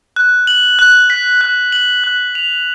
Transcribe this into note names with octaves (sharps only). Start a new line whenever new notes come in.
F#6
F#7
F#6
B6
F#6
F#7
F#6
F7